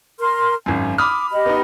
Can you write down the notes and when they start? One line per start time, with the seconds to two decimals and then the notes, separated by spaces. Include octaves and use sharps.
0.19 A#4 C6 F6
0.66 G#1 F#2 G#5
0.98 B5 D6 D#6 F6
1.31 G4 D#5 B5
1.46 B3 D#4